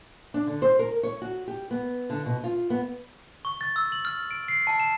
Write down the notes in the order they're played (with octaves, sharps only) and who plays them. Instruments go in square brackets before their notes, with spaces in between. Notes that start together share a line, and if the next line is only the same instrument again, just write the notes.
[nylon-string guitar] D4
D3
C5
A#4
C#5
F#4
G4
B3
D3
B2
F4
B3
[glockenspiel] C#6
A6
E6
F#7
F6
D7
C7
A5
E7